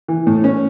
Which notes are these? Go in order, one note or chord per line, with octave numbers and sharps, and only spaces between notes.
E3
A2
C#4